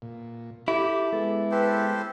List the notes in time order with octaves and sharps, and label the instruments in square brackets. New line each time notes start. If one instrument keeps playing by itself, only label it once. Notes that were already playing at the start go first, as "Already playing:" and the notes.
[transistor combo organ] A#2
[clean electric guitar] E4 [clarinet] G4 [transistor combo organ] A4
[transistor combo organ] G#3 B3 [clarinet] A4
[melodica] G4 A4 C5 [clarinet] B4